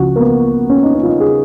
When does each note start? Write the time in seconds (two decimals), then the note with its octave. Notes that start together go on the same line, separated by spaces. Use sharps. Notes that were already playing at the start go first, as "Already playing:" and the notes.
Already playing: C#2 C#3 F3 F#4
0.16 A#3
0.20 B3
0.70 C#4
0.83 D#4
0.95 C#4
1.03 F4
1.07 D#4
1.20 G#4